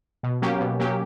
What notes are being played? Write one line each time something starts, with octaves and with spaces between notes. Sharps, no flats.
B2
F#3 A#3 C#4 G4
B2
F#3 A#3 C#4 G4